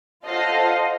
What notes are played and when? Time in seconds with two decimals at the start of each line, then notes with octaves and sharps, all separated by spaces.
0.24 F4 A4 C5 D#5 F5 F#5